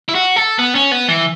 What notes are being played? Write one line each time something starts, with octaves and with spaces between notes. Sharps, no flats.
E4
F#4
A4
B3
C#4
B3
E3